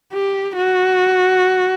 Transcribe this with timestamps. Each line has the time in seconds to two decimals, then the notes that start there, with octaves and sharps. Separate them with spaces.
0.13 G4
0.57 F#4